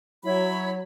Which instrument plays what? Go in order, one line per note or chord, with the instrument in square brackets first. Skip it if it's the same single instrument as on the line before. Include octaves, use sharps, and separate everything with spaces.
[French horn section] F#3 [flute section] E4 C#5 B5